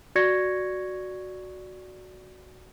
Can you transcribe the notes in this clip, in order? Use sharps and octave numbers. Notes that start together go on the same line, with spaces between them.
F#4 D5 C#6 G#6 A#6 C#7